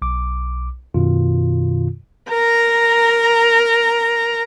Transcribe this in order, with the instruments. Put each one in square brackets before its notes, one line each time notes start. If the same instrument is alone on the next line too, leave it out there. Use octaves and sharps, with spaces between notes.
[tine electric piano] B1 D6
F#2 B2 D#3 F4
[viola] A#4 A#5